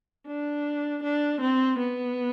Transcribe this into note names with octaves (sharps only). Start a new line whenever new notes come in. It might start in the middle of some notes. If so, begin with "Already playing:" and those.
D4
D4
C4
B3